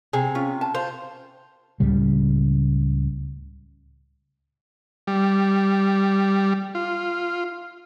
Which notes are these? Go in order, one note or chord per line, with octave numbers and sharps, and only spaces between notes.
C3 G#4
C#4 F4
A5
F4 C5
C#2 A2 C#3 G3
G3
F4